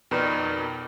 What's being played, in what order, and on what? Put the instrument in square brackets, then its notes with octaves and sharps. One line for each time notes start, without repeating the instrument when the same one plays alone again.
[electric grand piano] F2 B2 [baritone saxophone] D#3 [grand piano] A#4 B4 D5